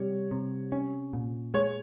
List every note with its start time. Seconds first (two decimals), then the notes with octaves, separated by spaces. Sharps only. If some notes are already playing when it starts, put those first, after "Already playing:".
Already playing: C3 G3 C#5
0.31 C3
0.72 C#4
1.13 A#2
1.54 G#3 C#5